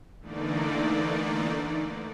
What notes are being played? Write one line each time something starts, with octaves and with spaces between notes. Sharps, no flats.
D3 E3 A3 A#3 D#4 D5